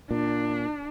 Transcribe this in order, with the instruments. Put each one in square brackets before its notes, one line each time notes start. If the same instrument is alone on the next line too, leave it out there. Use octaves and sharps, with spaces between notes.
[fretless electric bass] A#2 [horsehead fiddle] D4